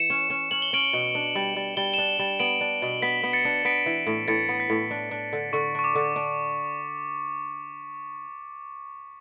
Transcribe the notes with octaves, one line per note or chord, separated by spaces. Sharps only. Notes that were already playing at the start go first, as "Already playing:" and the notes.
Already playing: E3 C#7 E7
C#4
C#4
C#4 F#7
G7
C#4 D7 F#7
B2
D4
G3
G3
G3 G7
D4 E7 G7
G3
B3 D7 F#7
D4
B2
B3 B6
B3
A6 C#7
D4
B3 B6 D7
E3
A2
A2 A6 C#7
B3
B6
A2
D4
D4
D3
D3 C#6
D4 C#6
D6
D3
D4